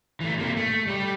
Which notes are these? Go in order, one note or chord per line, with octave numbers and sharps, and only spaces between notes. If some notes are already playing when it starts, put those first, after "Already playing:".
E3 A3
C3 A#3
A3
G3 G4